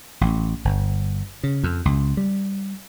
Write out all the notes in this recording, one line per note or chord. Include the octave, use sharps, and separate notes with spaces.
A1
G1
C#3
F2
C#2
G3